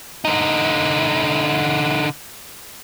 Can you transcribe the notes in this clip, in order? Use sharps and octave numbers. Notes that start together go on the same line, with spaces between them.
D3 D#4